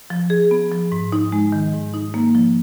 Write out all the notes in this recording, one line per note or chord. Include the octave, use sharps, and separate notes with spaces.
F3
G#4
B3
F3
G#2
D#4
G#3
D#3
G#2
D#4
A#3
F3